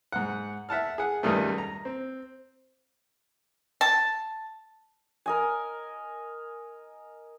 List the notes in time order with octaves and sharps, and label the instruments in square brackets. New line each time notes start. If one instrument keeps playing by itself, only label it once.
[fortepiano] G#2 F#5
E5 F#5 A5 F6
G#4 F#5
C#2 G2 D#3 G3 A3
A#5
C4
[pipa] A5
[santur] A#4 D#5 G#5